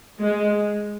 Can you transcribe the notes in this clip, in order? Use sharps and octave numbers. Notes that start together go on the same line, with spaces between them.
G#3